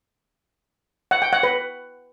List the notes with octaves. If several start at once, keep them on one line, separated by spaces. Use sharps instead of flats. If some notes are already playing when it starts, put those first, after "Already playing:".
F#5
G5
F#5
B4